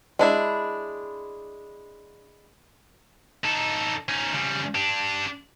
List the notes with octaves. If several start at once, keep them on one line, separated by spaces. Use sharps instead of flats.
G#3 D4 E4
D#4 A4
C#4 D#4
C#3 G3
D4 G4